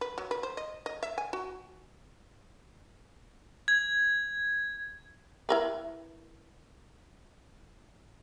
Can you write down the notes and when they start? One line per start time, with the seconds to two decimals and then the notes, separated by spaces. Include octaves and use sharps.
0.01 B4
0.18 F#3
0.31 B4
0.43 C5
0.57 D#5
0.86 D#5
1.03 E5
1.18 G#5
1.33 F#4
3.68 G#6
5.49 E4 A#4 B4